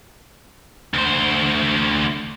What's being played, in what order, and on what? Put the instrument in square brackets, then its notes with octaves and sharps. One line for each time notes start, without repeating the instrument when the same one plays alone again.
[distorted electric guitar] D2 C5